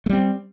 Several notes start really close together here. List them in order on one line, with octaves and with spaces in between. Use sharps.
A3 G3 C4